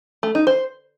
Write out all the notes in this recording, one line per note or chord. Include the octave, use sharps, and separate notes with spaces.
A3
D#4
C5